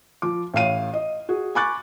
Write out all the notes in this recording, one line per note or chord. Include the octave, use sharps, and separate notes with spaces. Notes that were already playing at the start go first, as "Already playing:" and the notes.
F3 D6
A1 A2 F5 D#7
D#5
F#4 G#4
G#5 B5 C#6 D6 F#6 A6